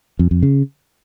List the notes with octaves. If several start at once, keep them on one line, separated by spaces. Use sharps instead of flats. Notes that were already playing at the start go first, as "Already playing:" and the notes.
F2
F2
C#3